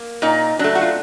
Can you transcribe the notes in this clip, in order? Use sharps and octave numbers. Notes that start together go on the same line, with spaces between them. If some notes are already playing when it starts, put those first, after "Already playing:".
Already playing: A#3
A#2 D#4
F#3 A3 D4
F#4
F4